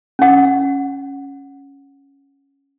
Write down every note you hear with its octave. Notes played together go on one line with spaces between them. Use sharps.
C#4 F#5